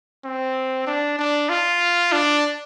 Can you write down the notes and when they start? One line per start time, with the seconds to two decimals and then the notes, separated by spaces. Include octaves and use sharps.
0.25 C4
0.87 D4
1.19 D4
1.49 F4
2.12 D4